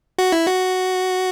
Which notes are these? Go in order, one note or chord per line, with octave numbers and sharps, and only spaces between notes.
F#4
E4
F#4